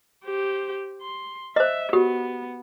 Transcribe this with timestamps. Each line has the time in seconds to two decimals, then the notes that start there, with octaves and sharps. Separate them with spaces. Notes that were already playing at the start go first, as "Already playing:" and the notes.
0.25 G4 C5
1.02 C6
1.56 C5 D#5 E5
1.93 B3 F#4 G4